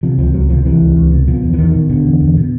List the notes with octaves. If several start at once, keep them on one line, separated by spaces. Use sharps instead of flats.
C3 F3
C#2 F3
C#2 F#3
C3 F3
C3 E3
C#2
C#2
C3
B2 F3
E2
E3
E2 D#3
B2
B2 D3
E2
E2
B2